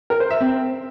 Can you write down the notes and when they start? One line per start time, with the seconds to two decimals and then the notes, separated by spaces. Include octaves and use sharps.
0.10 A#4
0.20 C5
0.30 E5
0.41 C4